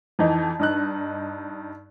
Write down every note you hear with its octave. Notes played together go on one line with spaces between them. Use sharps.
F2 E3 D#4
G2 D#4 F#6